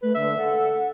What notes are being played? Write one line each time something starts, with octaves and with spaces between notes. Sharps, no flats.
A3 B4
D3 E5
A4 F#5